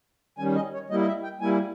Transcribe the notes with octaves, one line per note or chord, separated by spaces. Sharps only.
D#3 G3 C#4 G#5
D#5
C#5
G3 A#3 E4 D#5
D#5
E5
G5
G3 A#3 E4 G#5